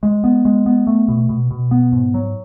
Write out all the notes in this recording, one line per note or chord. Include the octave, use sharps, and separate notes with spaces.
G#3
B3
G#3
B3
A3
B2
B2
B2
B3
G#2
F#3